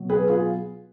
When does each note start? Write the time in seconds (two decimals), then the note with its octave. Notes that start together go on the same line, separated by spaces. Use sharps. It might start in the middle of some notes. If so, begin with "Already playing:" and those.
Already playing: B2 F#3
0.09 G#4 B4
0.28 F4 G#4